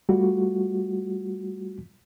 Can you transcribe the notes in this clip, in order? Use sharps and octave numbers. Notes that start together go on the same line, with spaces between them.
G3 A3 F4 F#4